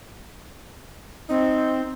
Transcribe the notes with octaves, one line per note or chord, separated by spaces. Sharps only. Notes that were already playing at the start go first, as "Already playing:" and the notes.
C4 D#4